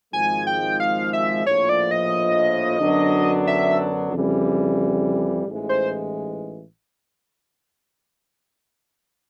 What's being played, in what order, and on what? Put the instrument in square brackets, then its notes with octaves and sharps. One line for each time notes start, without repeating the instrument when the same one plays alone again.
[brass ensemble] G#1 G#2 F3 G#3 [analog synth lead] G#5
[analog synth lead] G5
F5
E5
[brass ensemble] A#1 A2 F3 [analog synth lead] C#5
[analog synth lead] D5
D#5
[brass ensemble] F#2 D3 F#3 B3 D4
[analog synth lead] E5
[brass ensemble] F2 C#3 E3 G3
A1 G#2 E3 G#3
[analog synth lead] C5